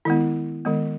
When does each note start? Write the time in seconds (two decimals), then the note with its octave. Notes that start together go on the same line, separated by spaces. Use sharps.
0.05 D#3 G#3 B3 E4
0.65 D#3 G#3 B3